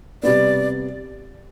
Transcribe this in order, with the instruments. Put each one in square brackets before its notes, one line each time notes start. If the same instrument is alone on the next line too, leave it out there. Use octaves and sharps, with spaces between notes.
[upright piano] C3 G3 B3 [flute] D5